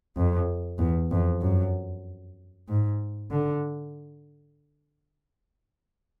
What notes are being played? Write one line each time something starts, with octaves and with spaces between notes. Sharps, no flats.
F2
E2
F2
F#2
G#2
D3